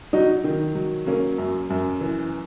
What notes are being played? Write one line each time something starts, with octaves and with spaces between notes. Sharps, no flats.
F#3 D#4 F#4
D#3
F#3
F#3 A#3 C#4
F#2
F#2
E3